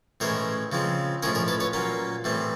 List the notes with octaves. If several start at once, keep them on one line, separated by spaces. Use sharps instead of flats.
A2 E3 G#3 C#4 A#4 C5
C#3 F3 G#3 C4
A2 F3 G#3 C#4 G#4 A#4
G#4 A#4
A4 B4
B4 C#5
A#2 F#3 A#3 C#4
A2 E3 G3 C4